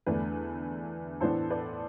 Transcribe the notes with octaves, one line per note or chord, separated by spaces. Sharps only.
E2 D3 A3 D4 B4
A2 E3 B3 D4 A4 C5
B4 D5